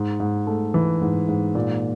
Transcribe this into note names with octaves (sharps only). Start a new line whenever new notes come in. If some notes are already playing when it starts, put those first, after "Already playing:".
Already playing: G#2
G#2
A3
E3
G#2
G#2
A#2